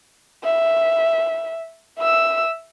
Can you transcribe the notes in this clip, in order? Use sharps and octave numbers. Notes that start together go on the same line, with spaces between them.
E5
E5 E6